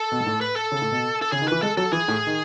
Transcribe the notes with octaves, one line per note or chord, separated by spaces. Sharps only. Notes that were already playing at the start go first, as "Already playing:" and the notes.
Already playing: A4
B2
G#2
A2
B4
A4
C#3
A2
B2
A4
C#3 G#4
D#3
E3 B4
G#3 A4
F#3 A4
E3 G#4
A2
D#3